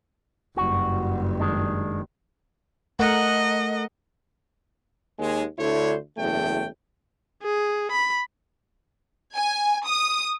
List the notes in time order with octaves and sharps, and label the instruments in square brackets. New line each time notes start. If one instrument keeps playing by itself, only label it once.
[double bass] F#1 G2 [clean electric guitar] F#4
[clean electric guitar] D#3 G#3 D4
[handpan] A3 A#4 F#5 [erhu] D#5
[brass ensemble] D#2 G#3
D2 D3 E4 C5 C#5
F#1 E2 A3 G5
[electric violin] G#4
B5
[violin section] G#5
D#6